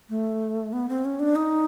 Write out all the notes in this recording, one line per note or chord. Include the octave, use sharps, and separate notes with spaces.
A3
B3
C4
C#4
D4
D#4